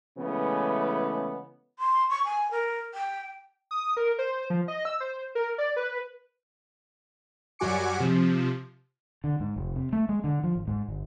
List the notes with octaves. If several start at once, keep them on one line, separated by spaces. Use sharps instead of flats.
C#3 E3 G#3 A3 B3
C6
C#6
G#5
A#4
G5
D#6
A#4
C5
F3
D#5
E6
C5
A#4
D5
B4
F#2 G3 F#4 G#5 D6 C#7
C3 F3
D3
G#2
F1
C3
A3
G#3
D3
F3
G#1
G#2
G1